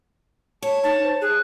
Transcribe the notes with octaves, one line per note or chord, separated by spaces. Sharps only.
C#5 A5
D#4 A5
C5
G#4 F#6